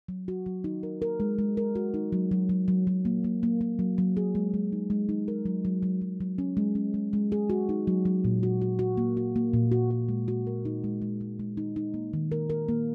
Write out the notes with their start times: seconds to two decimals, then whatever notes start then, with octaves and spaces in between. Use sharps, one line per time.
0.08 F#3
0.28 F#4
0.46 F#3
0.64 D#4
0.83 A#4
1.02 A#4
1.20 G#3
1.39 G#3
1.57 A#4
1.75 F#4
1.94 D#4
2.12 F#3
2.31 F#3
2.49 F#3
2.68 F#3
2.87 F#3
3.05 A#3
3.24 A#3
3.43 A#3
3.61 A#3
3.79 F#3
3.98 F#3
4.17 G#4
4.35 G#3
4.54 G#3
4.72 D#4
4.90 G#3
5.09 D#4
5.28 A#4
5.46 F#3
5.65 F#3
5.83 F#3
6.01 F#3
6.20 F#3
6.38 C#4
6.57 G#3
6.75 C#4
6.94 G#3
7.13 G#3
7.32 G#4
7.50 F#4
7.69 D#4
7.87 F#3
8.05 F#3
8.24 A#2
8.43 F#4
8.62 F#4
8.79 F#4
8.97 A#3
9.17 F#4
9.36 A#3
9.54 A#2
9.72 F#4
9.91 F#4
10.09 G#3
10.28 F#4
10.47 A#4
10.65 D#4
10.84 G#3
11.02 G#3
11.21 G#3
11.39 G#3
11.57 D#4
11.76 D#4
11.94 A#3
12.13 D#3
12.32 A#4
12.50 A#4
12.68 A#3